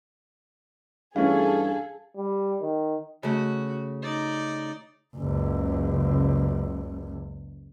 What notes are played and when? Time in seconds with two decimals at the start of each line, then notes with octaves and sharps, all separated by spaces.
1.16 G2 E3 A3 C#4 G#4 A4 F5
2.17 G3
2.61 D#3
3.23 C#3 A3 F#4
4.02 D#4 D5
5.16 F#1 C#2